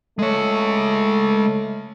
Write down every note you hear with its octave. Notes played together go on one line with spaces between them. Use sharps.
G#3 A3 C#5